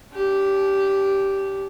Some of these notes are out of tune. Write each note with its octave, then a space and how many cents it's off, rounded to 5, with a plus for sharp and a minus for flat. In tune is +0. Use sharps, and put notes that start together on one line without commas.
D4 -45 G4 -5